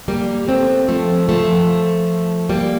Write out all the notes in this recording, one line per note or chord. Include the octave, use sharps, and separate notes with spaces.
G3 A#3
A3 C4
F3 A3
F3 A3
G3 A#3